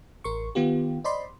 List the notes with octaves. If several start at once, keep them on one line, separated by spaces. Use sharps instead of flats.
A1 A#4 C6 C#6
D#3 B3 F4 G4
C5 D5 D#5 B5 C6